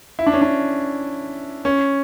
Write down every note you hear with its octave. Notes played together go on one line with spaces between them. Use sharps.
E4
D4
C#4
D4
C#4